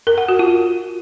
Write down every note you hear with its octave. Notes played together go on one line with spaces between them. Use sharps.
A#4
F#5
F#4
F4